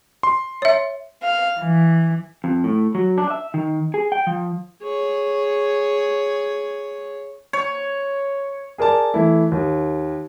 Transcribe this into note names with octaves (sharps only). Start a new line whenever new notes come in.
C6
C#5 E5
F5
E3
F2
A2
F#3
D4
E5
D#3
G#4
G5
F3
G#4 C#5
C#5
G#4 A#4 D5 A5
E3 A3 E4
D#2